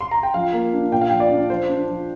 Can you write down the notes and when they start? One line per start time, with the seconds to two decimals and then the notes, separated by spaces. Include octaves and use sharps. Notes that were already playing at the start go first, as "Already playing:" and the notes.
0.01 C6
0.11 A#5
0.23 G5
0.34 F3 F5
0.53 A#3
0.73 D4
0.91 A#2 G5
1.01 F5
1.10 F3 G5
1.20 D5
1.30 D4
1.50 F3 C5
1.69 D4
1.88 F3